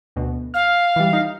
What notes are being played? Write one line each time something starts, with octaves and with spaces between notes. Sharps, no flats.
D2 B2
F5 F6
E3 G3
D#4